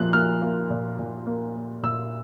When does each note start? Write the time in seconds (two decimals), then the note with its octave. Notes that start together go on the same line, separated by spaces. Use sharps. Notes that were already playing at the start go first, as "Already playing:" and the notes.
Already playing: A#2 F3 A#3 F#6
0.13 A#3 F6
0.42 A#3
0.70 A#2
0.99 A#2
1.27 A#3
1.56 A#3
1.83 A#2 E6